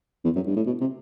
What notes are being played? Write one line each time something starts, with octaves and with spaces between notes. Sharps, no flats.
E2
F#2
G2
A2
B2
C3